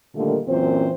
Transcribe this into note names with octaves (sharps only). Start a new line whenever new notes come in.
A#2 D3 D#3 G3 A3 A#3
F#2 A#2 E3 C4 C#4 C5